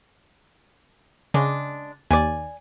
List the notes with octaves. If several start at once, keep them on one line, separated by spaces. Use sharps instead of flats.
C#3 G#3 D4
D#2 D5 G#5